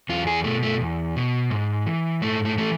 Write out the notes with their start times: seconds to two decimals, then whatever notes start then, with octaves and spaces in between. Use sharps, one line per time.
0.09 E2 F4
0.27 G#4
0.44 B2 A3
0.63 A3
0.81 E2
1.16 B2
1.50 G#2
1.86 E3
2.22 G#2 A3
2.45 A3
2.57 E3 A3